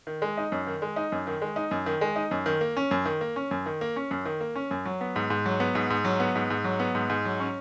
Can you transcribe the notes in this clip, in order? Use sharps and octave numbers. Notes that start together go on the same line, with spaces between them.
D#3
G#3
D#4
F#2
D#3
G#3
D#4
F#2
D#3
G#3
D#4
F#2
D#3
G#3
D#4
F#2
D#3
A#3
C#4
F#2
D#3
A#3
C#4
F#2
D#3
A#3
C#4
F#2
D#3
A#3
C#4
F#2
F#3
B3
G#2
G#2
F#3
B3
G#2
G#2
F#3
B3
G#2
G#2
F#3
B3
G#2
G#2
F#3
C#4